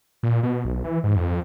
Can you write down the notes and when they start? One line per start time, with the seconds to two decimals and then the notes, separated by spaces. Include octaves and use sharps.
0.23 A#2
0.43 B2
0.65 B1
0.84 E3
1.04 G#2
1.16 F2